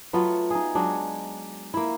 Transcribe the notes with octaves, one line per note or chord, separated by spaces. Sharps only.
F#3 A3 B3 F4
D#4 G#4
F#3 G#3 D4
A#3 E4